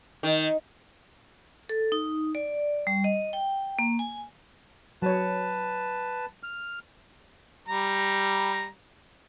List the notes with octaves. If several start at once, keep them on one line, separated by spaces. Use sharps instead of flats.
D#3
A4
D#4
D5
G3
D#5
G5
A#3
G#5
F#3 B4 C#5 A5
F6
G3 A#5